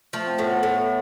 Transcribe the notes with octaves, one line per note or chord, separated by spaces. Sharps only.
F3 A3
C4
A2 B3
A2